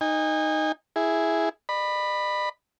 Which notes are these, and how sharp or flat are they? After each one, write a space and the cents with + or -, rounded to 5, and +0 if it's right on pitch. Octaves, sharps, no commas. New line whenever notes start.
D#4 +0 G#5 -35
E4 +0 G#4 +0
D5 +45 B5 +0